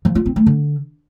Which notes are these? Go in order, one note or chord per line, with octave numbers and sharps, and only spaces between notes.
F3
F4
C4
A3
D3